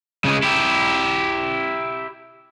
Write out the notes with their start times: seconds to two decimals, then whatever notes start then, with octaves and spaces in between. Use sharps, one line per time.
0.25 C#3 G#3
0.43 E4 G4